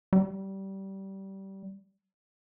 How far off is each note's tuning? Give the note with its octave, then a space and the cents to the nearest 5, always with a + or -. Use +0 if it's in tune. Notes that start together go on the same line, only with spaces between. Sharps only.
G3 -20